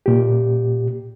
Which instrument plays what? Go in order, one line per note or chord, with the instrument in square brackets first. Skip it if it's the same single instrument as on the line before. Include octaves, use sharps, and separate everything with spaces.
[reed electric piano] A#2 G4